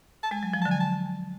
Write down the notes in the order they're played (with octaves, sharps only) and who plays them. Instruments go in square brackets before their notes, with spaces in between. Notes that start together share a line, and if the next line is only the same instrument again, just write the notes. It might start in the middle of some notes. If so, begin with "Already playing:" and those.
[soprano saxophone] A5
[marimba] G#3 [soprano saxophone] G#5
[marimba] F#3
F3
[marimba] D3 F#3 [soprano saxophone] A5
[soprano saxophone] G#5
A5